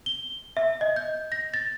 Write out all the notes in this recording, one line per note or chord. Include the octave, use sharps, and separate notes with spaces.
G7
E5
D#5
G6
A#6
A6